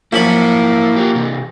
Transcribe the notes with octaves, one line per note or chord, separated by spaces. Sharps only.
F#2 F3 A#3 E4 C#5 B5
F4 G4
C3 E3